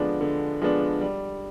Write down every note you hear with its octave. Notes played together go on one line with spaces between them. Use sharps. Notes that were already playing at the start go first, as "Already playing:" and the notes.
Already playing: D3 F3 G#3 B3 D4
D3
F3 G#3 B3 D4
G3